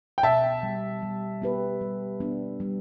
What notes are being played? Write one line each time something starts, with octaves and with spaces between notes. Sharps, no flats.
G5
B2 E5 A5
G3 B3
G3
B3 G4 B4
G3
B3 D4
G3